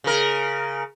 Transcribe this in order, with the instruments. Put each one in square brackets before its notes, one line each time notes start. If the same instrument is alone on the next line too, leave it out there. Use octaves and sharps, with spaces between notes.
[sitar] C#3 A#4